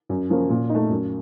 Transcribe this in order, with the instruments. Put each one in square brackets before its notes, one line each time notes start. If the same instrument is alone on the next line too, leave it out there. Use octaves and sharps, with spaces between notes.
[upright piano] F#2
F3 A#3 C#4
A#2
A3 D#4
F#2